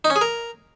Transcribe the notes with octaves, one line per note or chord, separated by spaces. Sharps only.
D#4
C#4
G#4
A#4